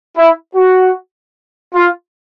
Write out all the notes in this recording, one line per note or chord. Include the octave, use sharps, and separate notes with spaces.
E4
F#4
F4